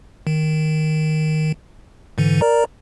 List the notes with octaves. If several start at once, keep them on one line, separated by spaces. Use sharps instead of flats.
D#3
G#2 D3 E3
A#4 D5 A#5